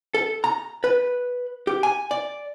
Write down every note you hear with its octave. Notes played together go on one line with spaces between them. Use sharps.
A4
A#5
B4
G4
G#5
D5